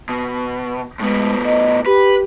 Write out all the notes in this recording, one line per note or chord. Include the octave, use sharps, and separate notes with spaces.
B2
A2 G#3 B3
D#5
G4 B4